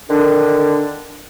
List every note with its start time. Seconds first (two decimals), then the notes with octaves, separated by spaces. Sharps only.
0.10 D3 D#3 D4